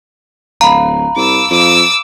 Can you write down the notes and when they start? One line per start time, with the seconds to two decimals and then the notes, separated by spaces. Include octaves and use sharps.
0.61 D1 F5 A#5 B5
1.16 C2 D6 E6
1.50 F2 D6 E6